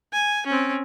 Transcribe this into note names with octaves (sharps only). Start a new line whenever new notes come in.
G#5
C4 C#4